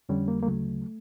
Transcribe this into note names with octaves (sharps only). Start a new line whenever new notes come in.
F2 D3 G3 C#4
A#3
A#3
D2 C#3 F#3 A3